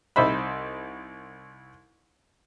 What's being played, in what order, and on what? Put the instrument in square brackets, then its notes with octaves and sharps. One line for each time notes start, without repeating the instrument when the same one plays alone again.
[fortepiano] C2 D#4 C5 E5 B5